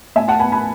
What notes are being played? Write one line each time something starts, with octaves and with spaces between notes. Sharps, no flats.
A2 E5 G#5
F#5 A5
B3 G#5 B5
G#5 B5